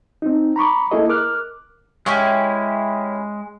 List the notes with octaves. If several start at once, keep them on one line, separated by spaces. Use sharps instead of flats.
C4 D#4
A#5 B5 C#6 D6
A#3 E4 G#4 A4 D#5
A#4 D6 F6 F#6
G#3 C#4 E4 G4